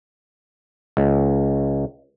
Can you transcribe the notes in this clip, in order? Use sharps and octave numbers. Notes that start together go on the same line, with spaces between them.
C#2